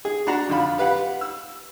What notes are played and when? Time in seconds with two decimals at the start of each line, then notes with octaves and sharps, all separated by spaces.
0.05 G#4
0.27 D4 F#4 F#5 A#5
0.49 F2 D3 F4 B5
0.78 G4 B4 F5 F#5
1.21 E6